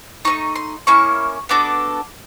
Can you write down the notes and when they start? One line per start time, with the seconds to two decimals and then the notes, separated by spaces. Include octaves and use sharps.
0.25 A3 C4 D#4 C#6
0.55 C6
0.87 A#3 C#4 E4 C#6
1.49 B3 D4 F#4 A4 D6